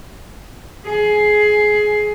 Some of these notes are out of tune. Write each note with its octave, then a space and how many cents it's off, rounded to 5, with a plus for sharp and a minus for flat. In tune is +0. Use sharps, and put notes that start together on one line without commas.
G#4 +15